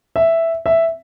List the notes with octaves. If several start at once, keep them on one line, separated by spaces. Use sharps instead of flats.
E5
E5